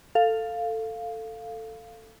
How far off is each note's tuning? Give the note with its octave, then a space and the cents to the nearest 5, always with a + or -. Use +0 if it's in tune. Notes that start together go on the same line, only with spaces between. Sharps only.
A4 +15 F5 +0